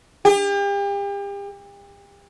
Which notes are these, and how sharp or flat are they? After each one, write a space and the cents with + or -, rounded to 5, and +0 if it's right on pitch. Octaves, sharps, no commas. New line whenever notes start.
G4 +40